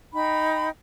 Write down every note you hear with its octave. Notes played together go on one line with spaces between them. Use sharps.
D#4 G5 B5